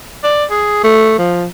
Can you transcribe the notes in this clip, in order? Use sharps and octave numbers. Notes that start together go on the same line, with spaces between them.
D5
G#4
A3
F3